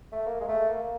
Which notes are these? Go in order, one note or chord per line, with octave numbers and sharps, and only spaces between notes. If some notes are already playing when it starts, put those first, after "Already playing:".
A3
A#3
G#3
A3
A#3